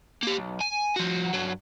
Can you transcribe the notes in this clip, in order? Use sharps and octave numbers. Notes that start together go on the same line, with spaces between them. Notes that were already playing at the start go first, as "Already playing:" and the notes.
A#3 G4
B1
G#5
F3 F#4
G2 F#3